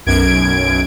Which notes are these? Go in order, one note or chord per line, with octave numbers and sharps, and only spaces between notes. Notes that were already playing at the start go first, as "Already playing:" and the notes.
B1 F#2 G#6 D7